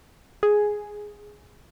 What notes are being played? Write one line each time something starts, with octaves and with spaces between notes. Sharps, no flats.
G#4